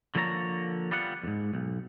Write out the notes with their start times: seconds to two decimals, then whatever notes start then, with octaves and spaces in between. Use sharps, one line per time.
0.15 D3 F3 A#3 A4 C#5 A#5
0.91 G3 B3 F4 F#5
1.24 F2 G#2
1.54 B1